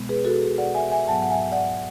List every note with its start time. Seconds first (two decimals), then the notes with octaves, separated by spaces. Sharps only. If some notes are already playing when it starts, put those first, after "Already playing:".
Already playing: B2 G#3 B3
0.09 G#4 B4
0.25 F#4 A4
0.42 G#4
0.58 D5 F#5
0.74 E5 G#5
0.91 E5 G#5
1.08 G#2 F#3 B3 F#5 A5
1.22 F#5
1.30 E5 G#5
1.52 D5 F#5